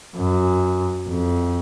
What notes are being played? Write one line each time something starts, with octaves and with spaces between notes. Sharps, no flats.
F#2
F2